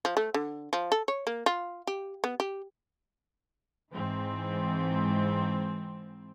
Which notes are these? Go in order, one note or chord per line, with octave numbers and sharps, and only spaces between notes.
F3
A3
D3
F3
A4
C#5
A#3
F4
G4
B3
G4
G#2 E3 C4